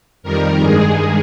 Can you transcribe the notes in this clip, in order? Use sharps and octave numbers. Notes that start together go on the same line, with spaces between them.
F2 D#3 G3 A#4
G2 D#3 G#3 G#4